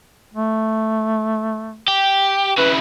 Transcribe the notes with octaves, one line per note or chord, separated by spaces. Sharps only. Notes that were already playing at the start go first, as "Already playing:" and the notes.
A3
G4
C#3 E4 B4